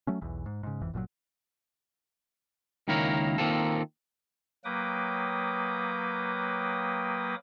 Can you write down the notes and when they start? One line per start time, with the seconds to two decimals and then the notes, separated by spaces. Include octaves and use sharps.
0.07 F#3 A3 C#4
0.21 B1 E2 E3
0.46 G#2
0.63 G#2 C#3
0.81 G#1 F2 E3
0.94 G1 A#2 D3 F#3
2.88 C#2 D#3 A#3 E4 A#4 C#5
3.38 D#3 A#3 C4 F4 A4
4.65 F#3 A#3 B4 G5 D6 D#6